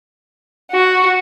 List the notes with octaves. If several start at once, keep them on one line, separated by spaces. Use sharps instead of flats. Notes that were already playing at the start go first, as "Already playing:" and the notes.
F#4